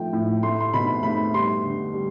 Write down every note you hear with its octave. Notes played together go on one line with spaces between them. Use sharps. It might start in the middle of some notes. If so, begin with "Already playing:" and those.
Already playing: F3 A3 G5
A2
A3 C6
C6
B2 B5
A3 B5
G3 C6
D3
G3